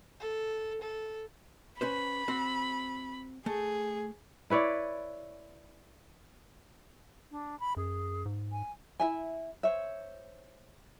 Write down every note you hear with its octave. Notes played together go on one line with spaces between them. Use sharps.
A4
A4
C#4 B4 C5 B5
C4 F#4 C5
A3 G#4
E4 B4 C#5 D5
D4
B5
F#2 G#4
G#2
G#5
E4 E5 G#5
C5 C#5 E5